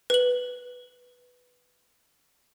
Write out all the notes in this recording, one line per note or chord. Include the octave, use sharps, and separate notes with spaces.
B4 F#7